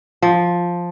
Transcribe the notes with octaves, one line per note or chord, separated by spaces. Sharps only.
F3